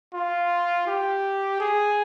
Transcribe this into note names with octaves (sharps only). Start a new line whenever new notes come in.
F4
G4
G#4